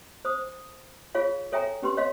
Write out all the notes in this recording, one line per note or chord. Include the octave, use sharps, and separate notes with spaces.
C5 D#6
F4 G#4 C#5 F5
A4 C#5 E5 G5 G#5 A#5
C#4 G4 B4 C6
C#5 D#5 F5 C6